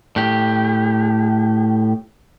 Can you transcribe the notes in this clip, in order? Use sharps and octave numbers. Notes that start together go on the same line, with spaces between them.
A2 G4